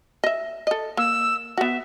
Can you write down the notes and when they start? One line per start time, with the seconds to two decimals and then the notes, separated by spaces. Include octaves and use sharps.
0.24 D#5 E5
0.67 A4 D#5
0.97 A#3 E6
1.58 B3 F#4 E5